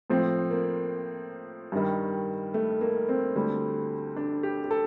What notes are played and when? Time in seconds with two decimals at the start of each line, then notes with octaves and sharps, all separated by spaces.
0.10 A2 F3 C4
0.51 A#3
1.72 G2 D#3 G3
2.54 A3
2.81 A#3
3.09 C4
3.36 D2 D3 G3
4.16 D4
4.43 G4
4.64 G4
4.71 A4